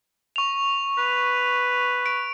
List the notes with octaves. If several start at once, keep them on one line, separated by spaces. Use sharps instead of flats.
C#6 F7
B4
D7